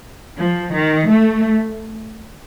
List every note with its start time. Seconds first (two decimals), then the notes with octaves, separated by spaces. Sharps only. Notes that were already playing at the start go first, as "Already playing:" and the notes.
0.37 F3
0.72 D#3
1.08 A3